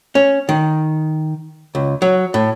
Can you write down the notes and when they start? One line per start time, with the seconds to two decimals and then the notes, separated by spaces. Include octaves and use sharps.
0.15 C#4
0.49 D#3
1.75 C#2
2.02 F#3
2.34 A2